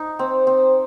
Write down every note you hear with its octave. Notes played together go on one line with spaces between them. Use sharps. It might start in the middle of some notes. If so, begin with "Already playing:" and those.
Already playing: D#4
C4
C4